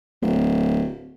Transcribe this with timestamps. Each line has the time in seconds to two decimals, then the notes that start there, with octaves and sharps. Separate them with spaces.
0.22 D1